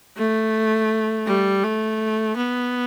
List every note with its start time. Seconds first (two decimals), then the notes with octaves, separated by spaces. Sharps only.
0.17 A3
1.27 G3
1.63 A3
2.36 B3